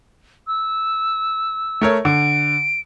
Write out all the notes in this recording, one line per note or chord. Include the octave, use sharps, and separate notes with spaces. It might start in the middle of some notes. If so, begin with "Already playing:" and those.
E6
A3 A#4 C#5
D3 D7